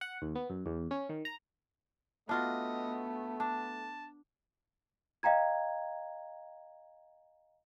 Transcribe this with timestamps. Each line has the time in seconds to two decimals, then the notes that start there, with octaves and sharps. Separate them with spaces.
0.01 F#5
0.22 D#2
0.35 B3
0.50 F#2
0.66 E2
0.91 C#4
1.09 D#3
1.25 A#5
2.29 A3 B3 D4 F4 F#4 D#5
3.40 D4 A5
5.23 D#5 F5 G5 A#5 G#6